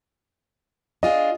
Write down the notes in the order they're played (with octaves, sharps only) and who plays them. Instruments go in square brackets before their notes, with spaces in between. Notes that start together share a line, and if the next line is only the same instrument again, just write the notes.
[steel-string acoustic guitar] D4 F4 G#4 [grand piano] D#5